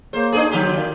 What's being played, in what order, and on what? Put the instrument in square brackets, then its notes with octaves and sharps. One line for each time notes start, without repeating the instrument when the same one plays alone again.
[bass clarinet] A#3 [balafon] G#4 A#4 C#5 [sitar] C5
[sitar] D4 G#4 [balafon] D#4 C5
[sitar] D3 G4 [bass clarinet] F#3 [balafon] A#5
[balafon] D#3 F#4 C6
A#4 D5 F5